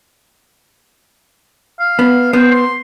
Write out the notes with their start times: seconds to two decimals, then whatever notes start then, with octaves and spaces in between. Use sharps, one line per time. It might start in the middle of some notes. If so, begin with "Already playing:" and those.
1.80 F5
1.99 B3
2.33 B3 C5
2.51 C6